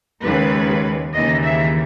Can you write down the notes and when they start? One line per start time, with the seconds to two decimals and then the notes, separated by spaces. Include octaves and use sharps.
0.23 D#2 C#3 G#3 B4
1.12 D#2 C#3 E3 D#5
1.42 E5